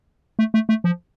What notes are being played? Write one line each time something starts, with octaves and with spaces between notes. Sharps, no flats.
A3
A3
A3
F3